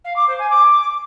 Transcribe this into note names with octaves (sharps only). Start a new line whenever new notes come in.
F5
D6
C5
G#5
D6